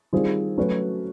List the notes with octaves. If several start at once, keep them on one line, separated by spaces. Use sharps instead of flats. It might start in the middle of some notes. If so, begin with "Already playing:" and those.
D#3 G3 C4 F4 G#4
F#3 A3 C#4 F#4 B4